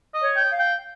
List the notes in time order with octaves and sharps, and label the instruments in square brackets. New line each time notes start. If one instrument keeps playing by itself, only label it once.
[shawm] D#5
[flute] C#5
[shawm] G5
[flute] F5
[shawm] G5